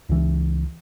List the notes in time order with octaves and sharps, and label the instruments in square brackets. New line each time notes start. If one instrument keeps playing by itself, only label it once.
[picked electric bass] C#2 E3